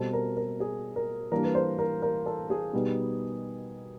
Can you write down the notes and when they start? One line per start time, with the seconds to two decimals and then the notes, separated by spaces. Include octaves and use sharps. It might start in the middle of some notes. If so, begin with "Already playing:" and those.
Already playing: B2 G3 C4 A4
0.13 A#4
0.37 A#4
0.60 G#4
0.96 A#4
1.32 E3 G3 A#3 D4 A#4
1.45 B4
1.55 C5
1.79 A#4
2.02 A#4
2.26 A4
2.50 G#4
2.73 B2 G3 B3 D#4